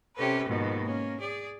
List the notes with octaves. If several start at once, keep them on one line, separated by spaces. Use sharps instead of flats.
C3 C#4 G4 A4 B4
D#2 G#2 B2 F3
A#3 C#4
G#4 D5